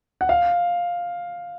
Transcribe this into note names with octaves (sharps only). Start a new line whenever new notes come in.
F#5
F5